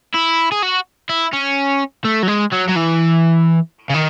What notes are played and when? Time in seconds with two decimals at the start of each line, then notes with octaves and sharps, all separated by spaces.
0.14 E4
0.52 G#4
0.63 F#4
1.09 E4
1.33 C#4
2.05 A3
2.23 F#3
2.28 G#3
2.52 F#3
2.68 F#3
2.75 E3
3.90 C#3
3.94 D#3